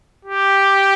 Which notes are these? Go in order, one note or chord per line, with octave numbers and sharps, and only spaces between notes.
G4